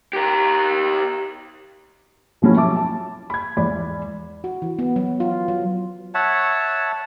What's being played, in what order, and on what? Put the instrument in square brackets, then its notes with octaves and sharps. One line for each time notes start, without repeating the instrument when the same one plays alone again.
[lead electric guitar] G4 A#4
[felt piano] B2 F3 F#3 A3 C#4 E4
E5 A5 D6
A5
B5 G#6
E2 G#2 D5 B5
[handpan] F#4
E3
B3
F#3
F4
F#3
[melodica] C#5 E5 F#5 A5